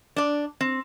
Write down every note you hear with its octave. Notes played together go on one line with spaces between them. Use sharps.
D4 D5
C4